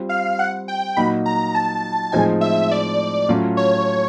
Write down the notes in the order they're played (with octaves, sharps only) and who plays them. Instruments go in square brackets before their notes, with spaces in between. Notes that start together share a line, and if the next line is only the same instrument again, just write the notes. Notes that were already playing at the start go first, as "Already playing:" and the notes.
Already playing: [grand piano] G3 C4 F4
[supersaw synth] F5
F#5
G5
[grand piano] A#2 F#3 A#3 D#4 F#4 [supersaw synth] B5
[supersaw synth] A#5
A5
[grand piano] A2 F3 G#3 C4 D#4 [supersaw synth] G#5
[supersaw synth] E5
D5
[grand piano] A2 F#3 A3 C#4 F4
[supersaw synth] C#5